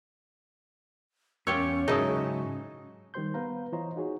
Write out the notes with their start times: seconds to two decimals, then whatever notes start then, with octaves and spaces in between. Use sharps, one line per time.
1.47 E2 C#4 F4 G4 C#5 E6
1.88 G#2 C#3 F#3 D#4 E4 G#4 A5 D#6
3.14 D#3 G3 G4 C5 C6 G6
3.34 B3 B4 F5 A#5
3.72 E3 F4 C5 C#5 D#5 A#5
3.96 D#4 F#4 G#4 C#5